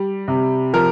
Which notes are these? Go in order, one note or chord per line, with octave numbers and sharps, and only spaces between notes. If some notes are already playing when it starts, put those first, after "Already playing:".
Already playing: G3
C3
F3 A#4